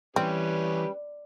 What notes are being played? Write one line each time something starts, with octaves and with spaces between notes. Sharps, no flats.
E3 G3 C4 C#4 G4 B4